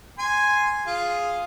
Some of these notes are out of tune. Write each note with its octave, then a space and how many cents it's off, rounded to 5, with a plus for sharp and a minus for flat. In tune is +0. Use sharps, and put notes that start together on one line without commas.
G#5 +0 C6 -5
F4 +0 G#4 +0